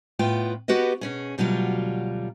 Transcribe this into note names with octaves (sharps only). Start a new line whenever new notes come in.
A2 B3 F4 G5
B3 F#4 G4 B4 D#5
B2 C#4 G#4
D2 B2 F#3 G3 F4